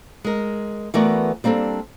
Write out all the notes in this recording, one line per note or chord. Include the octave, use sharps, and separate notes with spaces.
G#3 A#4
E3 A3 B3 F#4 A#4 D5
G3 A#3 C4 D4 A4